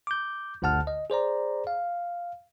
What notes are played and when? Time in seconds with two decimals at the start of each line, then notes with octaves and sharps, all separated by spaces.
0.07 D6 G6
0.62 G1 D2 D3 F#5 A5 F6
0.87 D#5
1.10 G#4 C5 D5 A#5
1.67 F5